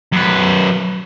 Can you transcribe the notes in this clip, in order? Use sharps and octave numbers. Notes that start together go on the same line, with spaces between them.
F#2 B4